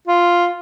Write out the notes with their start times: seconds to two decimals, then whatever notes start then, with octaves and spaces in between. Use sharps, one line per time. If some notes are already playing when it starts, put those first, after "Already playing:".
0.07 F4